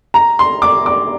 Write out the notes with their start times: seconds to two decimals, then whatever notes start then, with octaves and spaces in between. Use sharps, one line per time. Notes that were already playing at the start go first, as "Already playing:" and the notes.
0.14 A#5
0.39 C6
0.62 D6
0.86 D6